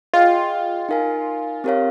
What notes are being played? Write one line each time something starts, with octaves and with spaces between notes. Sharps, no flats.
F4 G#4 D#5 G5
D#4 A#4 F5 G#5
C4 G4 A#4 C#5 F5